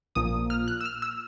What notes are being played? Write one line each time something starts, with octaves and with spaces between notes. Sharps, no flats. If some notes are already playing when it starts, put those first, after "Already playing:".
A#1 A#2 F3 A#3 D#6
F6
F#6
E6
F6
E6